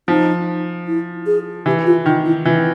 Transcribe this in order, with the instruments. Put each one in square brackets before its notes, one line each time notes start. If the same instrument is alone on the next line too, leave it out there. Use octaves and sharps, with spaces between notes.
[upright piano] F3 [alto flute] D#4
[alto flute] E4
G#4
[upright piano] E3 [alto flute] G4
[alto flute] F4
[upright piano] D#3 [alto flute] D#4
[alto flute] E4
[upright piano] E3 [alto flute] F4